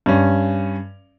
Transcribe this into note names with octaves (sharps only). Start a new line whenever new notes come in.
G2 C#4